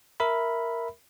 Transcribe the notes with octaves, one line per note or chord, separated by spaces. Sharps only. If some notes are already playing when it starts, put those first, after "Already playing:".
A#4 E5 B5